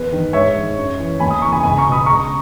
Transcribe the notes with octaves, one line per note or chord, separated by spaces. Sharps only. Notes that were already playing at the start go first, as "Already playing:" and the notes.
Already playing: E2 B4
D#3
G#2 C#5 E5
D#3
F#2
E3
D#2 G#5 B5
B5 D#6
C#3 E3 A#5 C#6
G#5 B5
C#2 G#5 B5
A#5 C#6
B2
B5 D#6
C#2 A#5 C#6